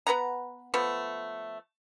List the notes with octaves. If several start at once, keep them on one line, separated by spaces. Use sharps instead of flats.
B3 B4 F#5 A#5
F3 A3 B3